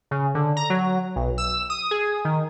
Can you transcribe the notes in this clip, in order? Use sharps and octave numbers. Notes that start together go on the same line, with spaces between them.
C#3
D3
A#5
F#3
B1
E6
D#6
G#4
D#3